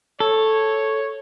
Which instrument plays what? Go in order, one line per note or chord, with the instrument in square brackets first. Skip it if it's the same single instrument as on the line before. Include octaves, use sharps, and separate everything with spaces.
[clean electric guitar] A4 [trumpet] C#5